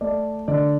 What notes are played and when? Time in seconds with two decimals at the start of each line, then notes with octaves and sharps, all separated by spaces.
0.01 A3 D5
0.48 D3 D5